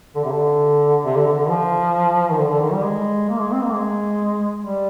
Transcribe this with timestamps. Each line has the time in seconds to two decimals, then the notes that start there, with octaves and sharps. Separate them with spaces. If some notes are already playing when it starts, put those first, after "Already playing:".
0.15 D3
0.24 C3
0.33 D3
1.04 C3
1.17 D3
1.27 D3
1.39 D3
1.49 F3
2.30 D#3
2.39 D3
2.50 D3
2.61 D#3
2.73 G3
2.85 G#3
3.29 A#3
3.40 G#3
3.52 C4
3.63 A#3
3.73 G#3
4.64 G3